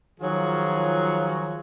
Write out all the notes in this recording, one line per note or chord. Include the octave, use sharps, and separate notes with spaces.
D#3 F3 F#3 F4 G#4